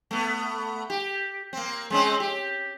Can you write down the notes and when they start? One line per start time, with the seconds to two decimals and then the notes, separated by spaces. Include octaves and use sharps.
0.11 A3 B3
0.90 G4
1.53 A#3 C4
1.90 G#3 C4 C#4
2.20 G4